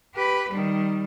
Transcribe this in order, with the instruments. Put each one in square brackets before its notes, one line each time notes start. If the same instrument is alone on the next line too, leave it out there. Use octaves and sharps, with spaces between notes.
[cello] G4 B4
D#3 G3